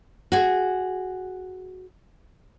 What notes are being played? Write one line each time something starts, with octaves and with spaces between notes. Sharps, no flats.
F#4 G#4